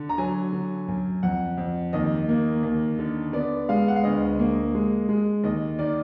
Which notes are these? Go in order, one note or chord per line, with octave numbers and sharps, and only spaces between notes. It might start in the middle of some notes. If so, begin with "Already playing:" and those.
Already playing: D3
A#5
F#3 G#5
D3
F#2
F2 F#5
F2
D#2 D#5
A#3
D#2
D3
B3 D5
G#3 F5
F#5
F5
D2 D#5
A#3
G#3
G#3
D#2 D#5
D#3 D5